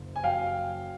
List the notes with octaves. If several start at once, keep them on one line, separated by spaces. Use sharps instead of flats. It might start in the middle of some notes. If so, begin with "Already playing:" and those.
Already playing: F#1
G#5
F#2 F5 G5